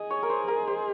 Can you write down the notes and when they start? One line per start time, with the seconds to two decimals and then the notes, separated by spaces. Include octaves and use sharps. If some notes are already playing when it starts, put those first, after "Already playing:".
Already playing: G#4 D#5
0.10 C#5
0.23 A#4
0.29 C5
0.48 A#4
0.67 C5